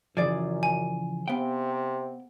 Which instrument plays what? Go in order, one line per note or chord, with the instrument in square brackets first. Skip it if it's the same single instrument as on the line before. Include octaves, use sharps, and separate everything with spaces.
[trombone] F#2 [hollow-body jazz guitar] C#3 E3 F3 [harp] G#4 D5
[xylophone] G#5
[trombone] C3 [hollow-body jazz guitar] B3 F5 G5